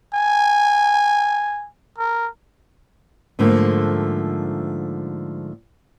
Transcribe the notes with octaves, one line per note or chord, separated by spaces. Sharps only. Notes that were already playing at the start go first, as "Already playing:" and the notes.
G#5
A#4
G#2 D3 F3 A3 A#3